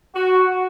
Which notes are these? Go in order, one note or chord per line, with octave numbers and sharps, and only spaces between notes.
F#4